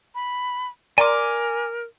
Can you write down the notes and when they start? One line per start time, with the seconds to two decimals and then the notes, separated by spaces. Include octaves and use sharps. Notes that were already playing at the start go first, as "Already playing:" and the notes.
0.15 B5
0.98 A#4 D5 G#5 A#5 C6 D6